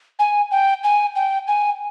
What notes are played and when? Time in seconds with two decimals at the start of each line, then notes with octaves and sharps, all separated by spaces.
0.19 G#5
0.51 G5
0.84 G#5
1.16 G5
1.48 G#5